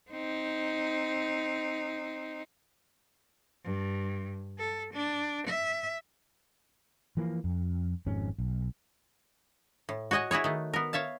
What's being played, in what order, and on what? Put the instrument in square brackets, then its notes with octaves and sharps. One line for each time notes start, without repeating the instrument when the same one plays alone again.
[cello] C4 D#4
G2
A4
D4
E5
[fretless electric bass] E3 F3 A#3
F2
G#1 F2 G#2 C#4
B1
[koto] A2
F#4 C#5 D#5 F#5 G#5
E4 F#4 G#4 C#5
D#3 A3
B3 A#4
C#5 E5 F5 A5